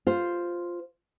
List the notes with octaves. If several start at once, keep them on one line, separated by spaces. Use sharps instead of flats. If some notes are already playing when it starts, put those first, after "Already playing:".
F4 C5